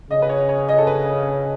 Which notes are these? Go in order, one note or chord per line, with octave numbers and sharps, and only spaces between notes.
C#3 D#5
B4
C#5
C#5
D#5
A4
B4